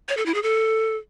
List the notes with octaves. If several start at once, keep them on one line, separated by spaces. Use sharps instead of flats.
C#5
A4
E4
G#4
A4